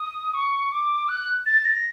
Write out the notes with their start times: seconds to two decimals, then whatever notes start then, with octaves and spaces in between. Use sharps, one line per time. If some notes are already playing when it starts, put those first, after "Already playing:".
Already playing: D#6
0.34 C#6
0.72 D6
1.08 F#6
1.46 A6
1.65 A#6